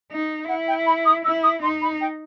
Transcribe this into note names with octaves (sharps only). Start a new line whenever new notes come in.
D#4
E4 F#5
G5
B5
D#6
E4 E6
D#6
D#4 C6
B5
G5